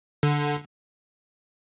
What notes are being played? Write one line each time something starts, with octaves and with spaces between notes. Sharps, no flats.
D3